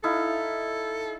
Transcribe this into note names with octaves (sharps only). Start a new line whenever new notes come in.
D#4 E4 A4 F5